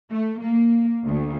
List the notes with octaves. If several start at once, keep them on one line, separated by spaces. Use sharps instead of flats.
A3
A#3
D2